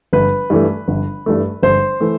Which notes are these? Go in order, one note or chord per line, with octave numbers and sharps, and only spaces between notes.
G1 B4
G2 E3 A3
G1
G2 E3 A3
G1 C5
E3 A3